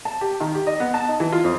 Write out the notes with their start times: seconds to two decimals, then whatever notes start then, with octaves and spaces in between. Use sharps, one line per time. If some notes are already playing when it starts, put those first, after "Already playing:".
0.05 A5
0.21 G4
0.40 D#3
0.55 G4
0.67 D#5
0.80 B3
0.94 A5
1.09 D#4
1.20 E3
1.32 F4
1.44 F2